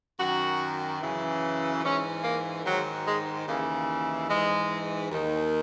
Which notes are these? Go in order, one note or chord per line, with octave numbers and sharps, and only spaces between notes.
F#2 D#3 F#4
F#2 C#3 E3
G#2 E3 C#4
A#3
G#2 D#3 F#3
G#3
D#2 C#3 E3 A#3
G#2 E3 G#3
D#2 D#3